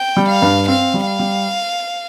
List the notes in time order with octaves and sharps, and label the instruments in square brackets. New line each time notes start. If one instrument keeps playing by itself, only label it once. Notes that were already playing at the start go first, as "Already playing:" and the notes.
Already playing: [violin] G5
[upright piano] G3
[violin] F5
[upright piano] G2
[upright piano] C4 [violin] F5
[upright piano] G3
[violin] F5
[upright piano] G3